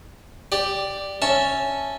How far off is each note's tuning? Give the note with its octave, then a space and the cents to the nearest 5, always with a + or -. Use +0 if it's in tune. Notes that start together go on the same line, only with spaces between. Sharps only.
G4 +0 D5 +5
C#4 +0 E5 +0 A5 +0